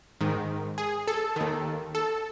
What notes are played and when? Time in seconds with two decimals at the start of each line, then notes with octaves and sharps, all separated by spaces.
0.21 G#2 D#3
0.78 G#4
1.07 A4
1.36 D#2 D#3
1.95 A4